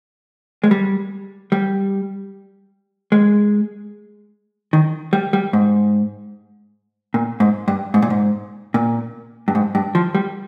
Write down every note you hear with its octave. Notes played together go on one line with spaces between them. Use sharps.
G#3
G3
G3
G#3
D#3
G3
G3
G#2
A#2
G#2
G2
G#2
A#2
G#2
A#2
G2
G#2
G2
F3
G3